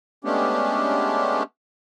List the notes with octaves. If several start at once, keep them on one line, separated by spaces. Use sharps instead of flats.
G#3 A3 B3 C#4 D4 G4